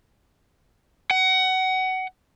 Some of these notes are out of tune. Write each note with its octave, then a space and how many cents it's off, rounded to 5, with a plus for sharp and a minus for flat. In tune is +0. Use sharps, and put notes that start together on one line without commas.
F#5 +25